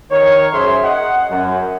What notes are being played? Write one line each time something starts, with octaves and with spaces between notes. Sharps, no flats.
D#3 A#4 C#5
F#2 G#4 C5 E5 C6
D#5 F#5
F#2